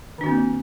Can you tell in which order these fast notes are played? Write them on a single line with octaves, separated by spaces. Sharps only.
D#3 D4 F#4 C4 A#3